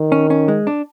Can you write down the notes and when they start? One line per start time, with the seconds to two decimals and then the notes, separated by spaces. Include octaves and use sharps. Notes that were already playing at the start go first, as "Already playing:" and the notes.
Already playing: D#3
0.12 C#4
0.30 C#4
0.48 G#3
0.67 D4